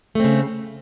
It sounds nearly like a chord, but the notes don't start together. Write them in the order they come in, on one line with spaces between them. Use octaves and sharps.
A3 C4 C#3